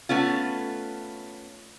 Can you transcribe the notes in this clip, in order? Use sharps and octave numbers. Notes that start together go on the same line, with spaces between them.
A3 B3 C#4 F4